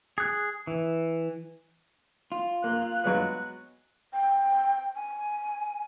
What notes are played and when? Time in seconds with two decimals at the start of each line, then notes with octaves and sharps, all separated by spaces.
0.18 G#4 F#6
0.67 E3
2.32 F4
2.64 A#3 F#6
3.04 F#3 G#3 B3
4.13 G5
4.95 G#5